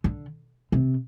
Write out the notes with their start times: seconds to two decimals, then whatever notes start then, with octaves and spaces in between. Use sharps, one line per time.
0.04 D3
0.72 C3